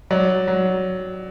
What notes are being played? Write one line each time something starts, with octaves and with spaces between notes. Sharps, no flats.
F#3 D5
F#3